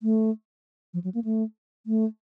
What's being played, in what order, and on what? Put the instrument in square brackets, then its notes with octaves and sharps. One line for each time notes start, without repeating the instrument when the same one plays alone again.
[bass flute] A3
F3
F#3
A#3
A3
A3